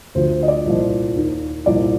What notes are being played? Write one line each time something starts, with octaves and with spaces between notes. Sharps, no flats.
D2 D3 F3 C5
C5
D#5
D5
C2 A#2 F3
D#2 D#3
C2 A#2 F3 D5